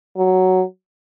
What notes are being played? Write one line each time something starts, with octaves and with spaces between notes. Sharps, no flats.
F#3